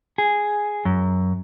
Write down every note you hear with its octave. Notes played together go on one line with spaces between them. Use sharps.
G#4
F#2